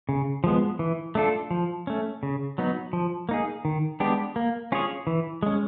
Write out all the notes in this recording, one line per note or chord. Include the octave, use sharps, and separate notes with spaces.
C#3
F3 G#3 B3
E3
A3 D4 F4 A4
F3
A3 C#4
C#3
F#3 B3 D#4
F3
A#3 D#4 G#4
D#3
G#3 B3 D4 G4
A#3
C#4 F4 G#4 C#5
E3
G#3 C#4